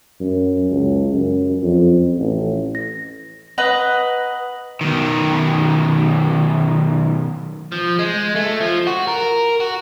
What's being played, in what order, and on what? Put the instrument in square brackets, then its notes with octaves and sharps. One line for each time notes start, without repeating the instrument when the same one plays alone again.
[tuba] F#2
C#2
F#2
F2
A1
[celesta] A#6
[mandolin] B4 D#5 A#5 [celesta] F#5 F#7
[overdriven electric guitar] B1 D#3
F3
G#3
A3
F3
F#4
A#4
F#4